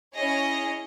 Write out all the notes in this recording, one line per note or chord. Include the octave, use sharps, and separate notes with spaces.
C#4 E4 G#4 C#5 D#5